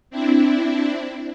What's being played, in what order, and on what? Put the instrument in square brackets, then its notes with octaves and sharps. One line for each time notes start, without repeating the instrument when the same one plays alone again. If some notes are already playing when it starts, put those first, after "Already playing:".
[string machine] C4 D4 E4